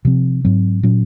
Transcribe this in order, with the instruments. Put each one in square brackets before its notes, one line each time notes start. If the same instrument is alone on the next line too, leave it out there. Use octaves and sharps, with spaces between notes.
[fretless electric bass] C3 F3 C4
G#2 F#3 C4
A#2 F#3 C#4